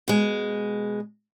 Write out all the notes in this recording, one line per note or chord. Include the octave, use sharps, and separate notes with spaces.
B2 G#3